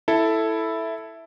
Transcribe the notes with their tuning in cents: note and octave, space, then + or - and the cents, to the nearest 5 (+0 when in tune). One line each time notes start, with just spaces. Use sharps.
E4 +0 A4 +0